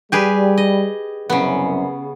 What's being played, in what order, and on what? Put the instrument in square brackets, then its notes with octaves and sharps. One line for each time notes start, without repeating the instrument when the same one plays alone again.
[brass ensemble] G3 [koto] G4 G#4 B4
[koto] D#5
[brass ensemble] C2 F#2 [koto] C#3 B3